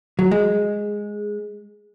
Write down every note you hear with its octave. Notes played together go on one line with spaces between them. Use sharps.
F#3
G#3